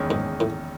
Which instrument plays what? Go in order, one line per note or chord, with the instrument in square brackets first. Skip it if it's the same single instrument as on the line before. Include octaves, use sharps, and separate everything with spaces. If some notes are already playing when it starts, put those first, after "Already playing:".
Already playing: [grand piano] F#1 E2 D#3 G#3 C#4
[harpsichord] G#2
A2